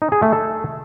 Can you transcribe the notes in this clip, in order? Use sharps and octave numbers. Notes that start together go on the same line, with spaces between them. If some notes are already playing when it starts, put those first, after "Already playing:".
D#4
G#4
A3
A4